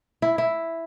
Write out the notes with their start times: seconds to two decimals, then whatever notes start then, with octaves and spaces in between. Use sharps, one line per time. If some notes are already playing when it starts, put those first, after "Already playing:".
0.22 E4
0.38 E4